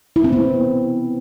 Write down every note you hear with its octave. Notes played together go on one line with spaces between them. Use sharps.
E4
C4
B3